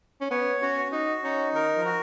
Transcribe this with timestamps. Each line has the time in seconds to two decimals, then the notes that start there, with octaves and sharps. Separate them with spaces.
0.21 C#4
0.31 B3 C#5
0.62 C#4 F#4
0.92 D#4 F#4
1.23 C#4 D#4
1.54 D#3 A#4
1.76 F3
1.85 F#4